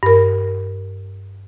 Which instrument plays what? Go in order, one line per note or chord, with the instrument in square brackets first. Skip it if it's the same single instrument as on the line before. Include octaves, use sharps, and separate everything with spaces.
[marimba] G2 A#4